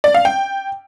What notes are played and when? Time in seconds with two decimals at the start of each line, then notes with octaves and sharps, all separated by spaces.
0.04 D5
0.14 F5
0.25 G5